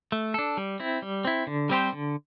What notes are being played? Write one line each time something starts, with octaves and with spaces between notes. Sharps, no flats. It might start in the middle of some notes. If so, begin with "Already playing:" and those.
A3
D4 A4
G3
C4 E4
G3
C4 E4
D3
G3 C4 G4 C5
D3